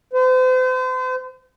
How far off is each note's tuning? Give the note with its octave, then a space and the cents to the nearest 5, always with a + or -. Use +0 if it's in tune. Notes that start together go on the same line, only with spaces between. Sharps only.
C5 -40